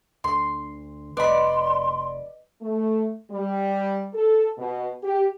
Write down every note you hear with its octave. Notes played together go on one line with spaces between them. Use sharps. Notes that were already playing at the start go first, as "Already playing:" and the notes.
D2 C6
F1 B4 D5 D#5 B5 C6
A3
G3
A4
B2
G4